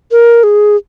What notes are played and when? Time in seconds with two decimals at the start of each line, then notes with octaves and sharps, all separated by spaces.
0.12 A#4
0.44 G#4